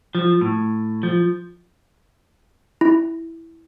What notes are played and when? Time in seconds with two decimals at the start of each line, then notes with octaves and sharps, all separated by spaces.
0.15 F3
0.41 A2
1.03 F3
2.81 E4